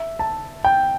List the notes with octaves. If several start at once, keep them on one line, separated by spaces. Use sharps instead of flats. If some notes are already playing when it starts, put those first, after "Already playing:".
Already playing: E5
A5
G5